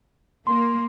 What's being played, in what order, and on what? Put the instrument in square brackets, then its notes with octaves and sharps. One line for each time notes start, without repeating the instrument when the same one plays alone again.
[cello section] A#3 [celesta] C6